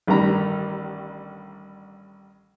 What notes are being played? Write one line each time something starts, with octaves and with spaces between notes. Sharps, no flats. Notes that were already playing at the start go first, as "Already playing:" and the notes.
A1 G2 D#3 A#5 B5